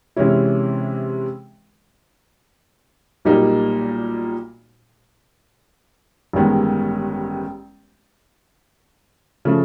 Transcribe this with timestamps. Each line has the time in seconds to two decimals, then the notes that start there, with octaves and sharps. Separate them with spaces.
0.16 C3 E3 G#3 C#4 E4
3.25 B1 A#2 G3 A#3 D#4
6.33 A1 G2 D#3 G#3 B3
9.45 C#3 F3 A3